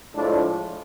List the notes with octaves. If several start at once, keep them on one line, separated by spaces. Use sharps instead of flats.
A2 F3 G#3 D4